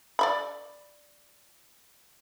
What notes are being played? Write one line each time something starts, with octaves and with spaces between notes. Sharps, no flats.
D5 E5 B5